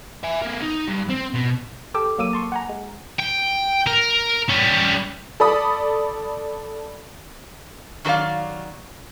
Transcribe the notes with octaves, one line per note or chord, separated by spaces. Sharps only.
E5 G#5
B3 A#4
D#4
G2
C4
B2
G4 A4 G5 D6 E6
F#3 A#3 D6 E6 D#7
A5 C6 C#6
F#5 G#5 A#5
G#3
G5
A#4
G3 C#4
A4 D5 B5 D#6
D#3 F#3 A4 D5 F5